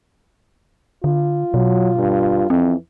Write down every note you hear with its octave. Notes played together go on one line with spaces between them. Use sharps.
D3 F4
B2 F#3
G2
F2 E3 C4